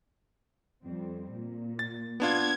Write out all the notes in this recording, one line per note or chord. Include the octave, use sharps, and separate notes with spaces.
F2 G3 C4
A#2
A6
B3 D4 F4 G#6